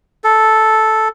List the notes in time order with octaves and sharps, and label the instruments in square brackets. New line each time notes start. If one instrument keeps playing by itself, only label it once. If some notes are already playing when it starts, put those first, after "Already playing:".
[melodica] A4